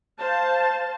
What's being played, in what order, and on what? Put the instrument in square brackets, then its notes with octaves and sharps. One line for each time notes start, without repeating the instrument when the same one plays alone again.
[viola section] C5 F5 A5